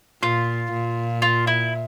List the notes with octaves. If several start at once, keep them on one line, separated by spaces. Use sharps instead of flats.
A#2 F4
A#2
F4
E4